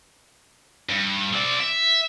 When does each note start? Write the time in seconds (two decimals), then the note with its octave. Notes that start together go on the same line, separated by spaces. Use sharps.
0.89 G2
1.34 C4 D5
1.60 E5